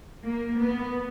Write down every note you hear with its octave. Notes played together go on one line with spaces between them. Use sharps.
A#3
B3